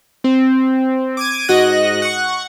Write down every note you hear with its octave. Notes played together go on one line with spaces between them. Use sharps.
C4
D6 G#6 D#7
G#2 F#4 D#5 F#6 A#6
F#5 C#6